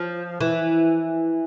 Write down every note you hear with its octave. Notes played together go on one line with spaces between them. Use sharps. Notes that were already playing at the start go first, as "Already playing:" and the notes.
Already playing: F3
E3